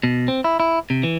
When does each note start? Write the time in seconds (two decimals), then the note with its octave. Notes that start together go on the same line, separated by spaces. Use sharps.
0.03 B2
0.28 C4
0.44 E4
0.60 E4
0.90 C3
1.03 E3